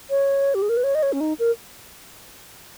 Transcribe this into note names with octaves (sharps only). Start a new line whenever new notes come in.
C#5
G4
G#4
A#4
B4
C#5
D#5
C#5
C#4
D#4
A#4